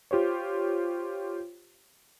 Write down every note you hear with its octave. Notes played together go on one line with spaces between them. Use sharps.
F4 G4 C5 C#5